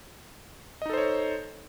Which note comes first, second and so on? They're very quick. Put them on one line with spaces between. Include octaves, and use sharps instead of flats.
D#5 D#4 A4 C5 C#5